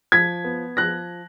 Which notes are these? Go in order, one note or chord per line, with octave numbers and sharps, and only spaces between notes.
F3 G#6 B6
B3
F3 F#6 A#6